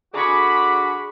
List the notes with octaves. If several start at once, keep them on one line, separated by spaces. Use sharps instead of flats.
D3 F#4 G#4 B5 C#6 D6